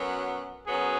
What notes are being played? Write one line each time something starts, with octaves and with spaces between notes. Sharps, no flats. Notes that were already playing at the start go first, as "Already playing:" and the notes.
Already playing: F#2 F#3 B3
F#2 F#3 B3 G#4